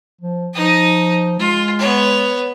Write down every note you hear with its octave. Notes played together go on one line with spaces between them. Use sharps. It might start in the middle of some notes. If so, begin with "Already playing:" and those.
F3
F3 D#4 D#6
G#3 F4
B3 C#5